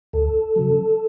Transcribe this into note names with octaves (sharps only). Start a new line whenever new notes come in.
D2 A4
C#3 F#3